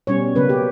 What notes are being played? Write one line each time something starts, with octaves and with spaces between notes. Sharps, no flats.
B2 G3 C#4 C#5
C#3 F#3 A#3 B4
G4